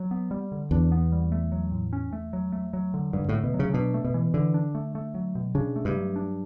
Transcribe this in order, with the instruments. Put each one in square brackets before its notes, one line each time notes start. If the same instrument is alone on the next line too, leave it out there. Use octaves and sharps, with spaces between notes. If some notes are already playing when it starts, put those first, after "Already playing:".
Already playing: [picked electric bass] F#3
B3
G3
D3
[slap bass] E2 [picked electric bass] D4
[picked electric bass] B3
G3
A3
F#3
A2
C#4
A3
F#3
A3
F#3
D3
[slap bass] G2 [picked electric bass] D3
[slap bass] A2 [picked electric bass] A3
[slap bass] B2
[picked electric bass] F#3
[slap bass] C#3
[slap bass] B2 [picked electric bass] D4
[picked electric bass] A3
[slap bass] B2
[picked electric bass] E3
[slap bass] D3 [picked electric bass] E3
[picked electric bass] D4
A3
A3
F#3
B2
[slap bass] C#3 [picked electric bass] D4
[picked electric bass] A3
[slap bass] G2
[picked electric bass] F#3
D4